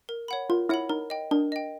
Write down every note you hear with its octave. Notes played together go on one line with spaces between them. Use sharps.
A#4
C#5 F#5 B5
F4 A#4
E4 C#5 F#5 B5
D#4 A#4
D#5 G5
D4 A#4
D#5 G5